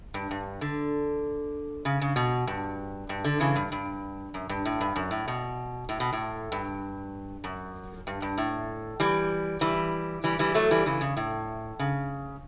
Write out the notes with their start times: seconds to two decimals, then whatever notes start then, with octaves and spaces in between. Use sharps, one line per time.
0.14 G2
0.31 G2
0.61 D3
1.85 C#3
2.02 C#3
2.16 B2
2.47 G2
3.09 G2
3.25 D3
3.40 C#3 E3
3.56 G2
3.72 G2
4.34 F#2
4.49 G2
4.66 A2
4.81 G2
4.96 F#2
5.11 A2
5.28 B2
5.89 A2
6.00 B2
6.13 A2
6.52 G2
7.44 F#2
8.07 G2
8.22 G2
8.38 A2
9.00 E3 G3
9.61 E3 G3
10.24 E3 G3
10.39 E3 G3
10.54 F#3 A3
10.71 E3 G3
10.86 C#3 E3
11.01 C#3
11.17 A2
11.79 C#3